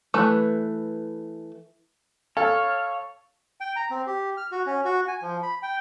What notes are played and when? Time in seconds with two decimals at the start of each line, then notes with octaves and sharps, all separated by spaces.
0.14 E3 A3 B4
2.37 A4 C#5 F5 F6
3.61 G5
3.76 A#5
3.91 C4
4.07 G4
4.37 F6
4.52 F#4
4.66 C#4
4.85 F#4
5.08 G#5
5.22 F3
5.43 B5
5.63 G5